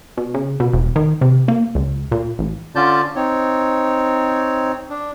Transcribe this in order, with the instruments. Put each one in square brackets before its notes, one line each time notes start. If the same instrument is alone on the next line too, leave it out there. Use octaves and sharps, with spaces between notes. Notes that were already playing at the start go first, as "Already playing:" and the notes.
[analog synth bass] B2
C#3
B2
E1
D#3
C3
A#3
C#2
A#2
A1
[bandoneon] D3 C#4 F4 D5 A5 G6
C4 D#4 C#5
D4